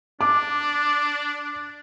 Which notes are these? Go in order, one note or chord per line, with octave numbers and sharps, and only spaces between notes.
D4 D6